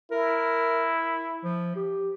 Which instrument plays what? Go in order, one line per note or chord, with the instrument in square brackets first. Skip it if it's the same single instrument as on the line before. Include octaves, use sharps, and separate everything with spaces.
[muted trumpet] E4 [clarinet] A#4
[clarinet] F3
G4